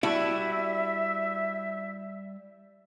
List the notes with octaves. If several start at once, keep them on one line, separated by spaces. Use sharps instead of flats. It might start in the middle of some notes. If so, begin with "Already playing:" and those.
G3 D4 E4 F#4 E5